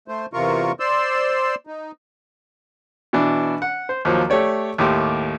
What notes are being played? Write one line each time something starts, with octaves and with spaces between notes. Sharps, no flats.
A3 C5
E2 C3 F4 A#4 C#6
C5 D5 C6 E6
D#4
B2 E3 D4
F#5
C5
D#2 F3 F#3
A3 G4 C#5 D5
D#2 A2 G4 C6